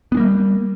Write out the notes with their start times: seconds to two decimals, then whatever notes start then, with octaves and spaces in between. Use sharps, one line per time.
0.12 B3
0.15 D4
0.17 A#3
0.20 G3